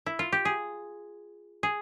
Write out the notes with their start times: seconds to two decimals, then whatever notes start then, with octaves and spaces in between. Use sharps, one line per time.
0.06 E4
0.19 F4
0.32 G4
0.45 G#4
1.63 G#4